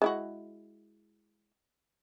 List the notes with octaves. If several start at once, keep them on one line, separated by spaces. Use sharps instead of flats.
G#3 E4 F#4